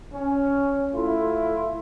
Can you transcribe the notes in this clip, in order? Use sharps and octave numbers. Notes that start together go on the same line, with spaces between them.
C#4
A3 E4 F4